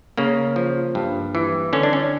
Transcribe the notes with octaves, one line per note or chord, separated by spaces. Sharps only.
C#3 A#3
F3
G2
E3
D3 C#4
D4
C#4